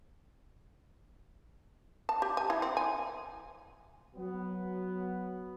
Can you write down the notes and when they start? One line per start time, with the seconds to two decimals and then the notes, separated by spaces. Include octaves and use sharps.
2.09 A5
2.22 G4
2.37 G#5
2.50 E4
2.62 C4
2.77 G#5
4.15 F#3 B3